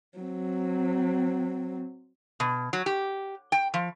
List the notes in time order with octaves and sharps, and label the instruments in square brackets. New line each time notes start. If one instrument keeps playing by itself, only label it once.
[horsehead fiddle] F#3 C4
[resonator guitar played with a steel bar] B2
F#3
G4
G5
F3